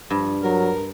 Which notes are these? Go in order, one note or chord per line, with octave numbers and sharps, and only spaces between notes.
G2 F3
F#3 A#4